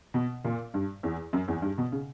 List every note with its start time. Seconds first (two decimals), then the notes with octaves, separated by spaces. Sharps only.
0.14 B2
0.44 A#2
0.74 G2
1.03 E2
1.33 F#2
1.48 E2
1.62 G2
1.78 B2
1.92 C#3